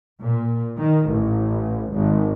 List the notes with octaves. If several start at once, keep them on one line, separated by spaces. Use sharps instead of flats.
A#2
D#3
A1
G#1